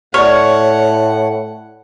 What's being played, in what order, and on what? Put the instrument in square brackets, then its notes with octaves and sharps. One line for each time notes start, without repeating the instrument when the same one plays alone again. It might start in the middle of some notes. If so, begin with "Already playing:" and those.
[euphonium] A2 [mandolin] C#5 [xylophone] D5 F6 [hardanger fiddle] F#5